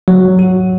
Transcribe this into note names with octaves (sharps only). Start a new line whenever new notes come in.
F#3
F#4